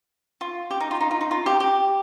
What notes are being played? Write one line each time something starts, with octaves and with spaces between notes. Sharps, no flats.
F4
G4
D#4
F4
D#4
F4
D#4
F4
G4
G4